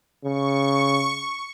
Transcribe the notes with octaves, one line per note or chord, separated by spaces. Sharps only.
C#3 C#6